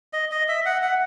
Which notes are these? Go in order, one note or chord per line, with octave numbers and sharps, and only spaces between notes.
D#5
D#5
E5
F#5
F#5